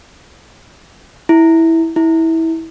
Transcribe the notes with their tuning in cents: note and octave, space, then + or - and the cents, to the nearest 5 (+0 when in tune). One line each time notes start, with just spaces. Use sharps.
E4 -15
E4 -25